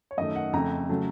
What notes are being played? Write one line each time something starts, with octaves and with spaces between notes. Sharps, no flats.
C#5
F#2 D#3 A3 D#5
F#5
F2 C#3 A3 A#5
C#3 F#3 A3